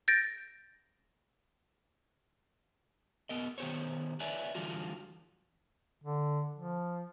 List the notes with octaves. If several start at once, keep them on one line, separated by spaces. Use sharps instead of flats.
G6 A6 A#6 D7
B3 A#4 D#5
D#3 B3 G4 C5 C#5
B4 C#5 D5 E5 G#5
D3 E3 G3 F4 F#4
D3
F3